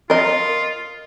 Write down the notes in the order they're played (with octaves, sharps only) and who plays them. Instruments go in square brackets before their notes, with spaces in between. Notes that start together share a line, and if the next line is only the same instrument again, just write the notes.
[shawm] F4 [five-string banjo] A#4 D#5